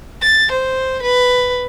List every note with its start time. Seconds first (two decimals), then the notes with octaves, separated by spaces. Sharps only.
0.22 A6
0.51 C5
1.02 B4